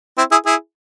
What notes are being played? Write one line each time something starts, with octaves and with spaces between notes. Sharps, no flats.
C4 E4
E4 G#4
E4 G#4